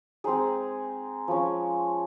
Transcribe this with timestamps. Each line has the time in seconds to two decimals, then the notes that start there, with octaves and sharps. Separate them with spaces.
0.24 G#3 C4 D#4 G#4
1.28 F3 G#3 C#4